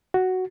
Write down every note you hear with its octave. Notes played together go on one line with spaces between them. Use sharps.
F#4